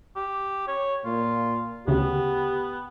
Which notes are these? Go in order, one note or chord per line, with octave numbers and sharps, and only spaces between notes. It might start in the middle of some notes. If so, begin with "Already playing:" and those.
G4
C#5
A#2 F4
D2 C#3 B3 G4